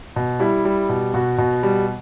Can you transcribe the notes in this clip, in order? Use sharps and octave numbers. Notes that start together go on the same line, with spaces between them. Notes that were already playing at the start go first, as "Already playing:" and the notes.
B2
G3 E4
G3
B2
B2 F#4
B2
G3